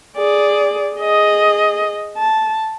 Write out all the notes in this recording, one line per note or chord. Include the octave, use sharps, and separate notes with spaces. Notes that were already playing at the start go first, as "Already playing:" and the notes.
G#4 D5
G#4 D#5
A5